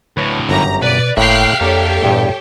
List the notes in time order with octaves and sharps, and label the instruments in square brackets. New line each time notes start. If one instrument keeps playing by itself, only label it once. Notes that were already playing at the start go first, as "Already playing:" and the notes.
[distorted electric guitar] D2 A2 [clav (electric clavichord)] B4 C#5
[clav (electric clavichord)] G1 F#2 G4 [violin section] A#5
[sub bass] B2 [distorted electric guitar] B4 [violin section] D5
[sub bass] G1 [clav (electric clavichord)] A2 A#3 [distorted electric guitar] E5 F5 [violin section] G5 F#6 C7
[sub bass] F2 [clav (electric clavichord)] A#3 D4 [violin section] G4 A4 C#5
[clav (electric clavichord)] E2 G2 [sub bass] A#2